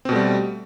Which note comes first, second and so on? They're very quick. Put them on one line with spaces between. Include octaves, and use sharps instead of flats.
C4 B2 A3 G3